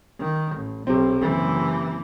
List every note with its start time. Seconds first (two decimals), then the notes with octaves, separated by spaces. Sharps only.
0.19 D#3
0.56 A1
0.87 B1 C3 C4
1.21 F#1 E3